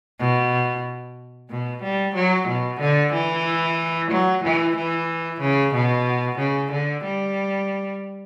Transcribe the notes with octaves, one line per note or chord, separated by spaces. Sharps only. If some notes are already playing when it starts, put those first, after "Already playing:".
B2
B2
G3
F#3
B2
D3
E3
F#3
E3
E3
C#3
B2
C#3
D3
G3